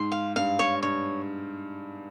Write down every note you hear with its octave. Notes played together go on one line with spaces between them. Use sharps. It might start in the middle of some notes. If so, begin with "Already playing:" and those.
Already playing: G#2 C6
F5
G2 F5
C#5
G2 C#5